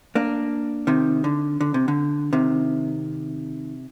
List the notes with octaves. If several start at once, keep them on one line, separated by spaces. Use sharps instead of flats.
A#3 D4
C3 D#3
D3
D3
C3
D3
C3 D#3